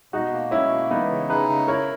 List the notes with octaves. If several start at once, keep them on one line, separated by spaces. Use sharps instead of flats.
B2 D#4 F#4
A#3
B2 C#4 E4
A#3
E3 B3 D#4
C#3
D#4 G#4 B4
C#3
E4 A#4 C#5